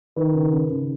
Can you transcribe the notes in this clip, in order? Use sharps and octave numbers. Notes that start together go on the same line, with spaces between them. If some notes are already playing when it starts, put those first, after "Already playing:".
D#3 B4
C#3
C#3
C#3